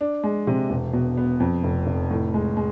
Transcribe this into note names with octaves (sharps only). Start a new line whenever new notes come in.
D4
G#3
C3
E1
B2
B3
F2
F1
F1
A2
G#3
G#3